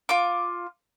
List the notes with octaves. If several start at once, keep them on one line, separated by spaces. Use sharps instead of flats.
F4 D6